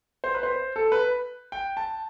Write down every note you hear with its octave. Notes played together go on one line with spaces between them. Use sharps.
C5
B4
C5
A4
B4
G5
A5